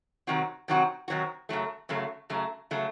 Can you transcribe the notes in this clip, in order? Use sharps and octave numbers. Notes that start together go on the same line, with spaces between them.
C3 D#3 F#3 C4 F#4
C3 D#3 F#3 C4 F#4
C3 D#3 F#3 C4 F#4
F#2 C#3 F#3 A3
F#2 C#3 F#3 A3
F#2 C#3 F#3 A3
C#3 F#3 A3